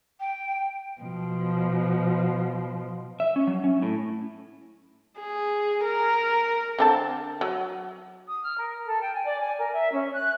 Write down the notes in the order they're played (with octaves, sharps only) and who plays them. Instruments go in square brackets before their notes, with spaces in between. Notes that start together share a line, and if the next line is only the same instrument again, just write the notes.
[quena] G5
[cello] B2 F3
[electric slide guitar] E5
C#4
F#3
C#4
A2
[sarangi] G#4
A#4
[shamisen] D3 C4 A5
F#3
[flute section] D#6
F6
A#4
A4
G5
G#5
D5
G#5
A#4
E5
C#4
F#6